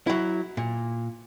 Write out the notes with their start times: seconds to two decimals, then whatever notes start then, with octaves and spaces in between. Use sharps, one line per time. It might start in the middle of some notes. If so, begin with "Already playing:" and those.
0.07 F#3 E4
0.57 A#2